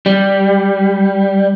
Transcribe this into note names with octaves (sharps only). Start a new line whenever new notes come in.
G3